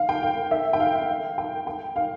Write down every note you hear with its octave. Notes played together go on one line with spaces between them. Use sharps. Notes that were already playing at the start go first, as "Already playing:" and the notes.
Already playing: F5
G5
F5
E5
G5
F5
G5
G5
F5